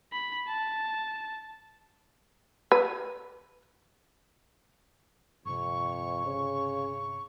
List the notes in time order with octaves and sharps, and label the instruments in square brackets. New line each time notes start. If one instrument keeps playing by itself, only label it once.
[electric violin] B5
A5
[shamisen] B4
[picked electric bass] G1 C3 [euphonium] F2 [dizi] C#6
[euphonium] C#3